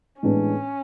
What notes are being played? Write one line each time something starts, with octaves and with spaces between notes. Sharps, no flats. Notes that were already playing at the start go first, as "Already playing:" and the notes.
A2 E3 G#3 B3 C#4 D4